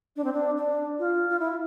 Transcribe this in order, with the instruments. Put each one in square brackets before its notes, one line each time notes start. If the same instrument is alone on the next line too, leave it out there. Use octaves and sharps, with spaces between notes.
[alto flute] D4
C4
D4
D4
F4
F4
E4